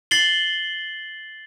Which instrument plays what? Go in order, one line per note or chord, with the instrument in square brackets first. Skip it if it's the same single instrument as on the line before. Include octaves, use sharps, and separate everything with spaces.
[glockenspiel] A6 C7 F#7 G7